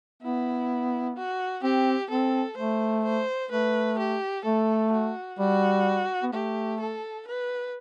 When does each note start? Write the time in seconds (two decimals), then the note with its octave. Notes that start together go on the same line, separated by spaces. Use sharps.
0.22 B3 E4
1.16 F#4
1.63 C4 G4
2.10 C4 A4
2.57 A3 C5
3.04 C5
3.51 A3 B4
3.99 G4
4.45 A3 A4
4.92 F#4
5.39 G3 F#4
6.23 B3
6.33 A3 G4
6.80 A4
7.27 B4